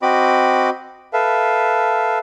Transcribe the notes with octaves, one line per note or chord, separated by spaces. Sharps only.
C4 F#4 D#5 B5 D6
A4 B4 E5 F5